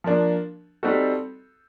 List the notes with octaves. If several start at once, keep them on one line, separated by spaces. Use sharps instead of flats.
F3 A#3 D4
G3 C4 D#4 F#4 A4